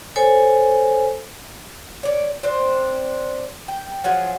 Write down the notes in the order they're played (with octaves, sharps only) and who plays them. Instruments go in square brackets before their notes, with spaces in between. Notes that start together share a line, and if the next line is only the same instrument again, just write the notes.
[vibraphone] A4 C5 C#5 G#5
[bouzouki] C#5 D5
C4 D4 C5
G5
[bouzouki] F3 F#3 G#4 [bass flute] F#5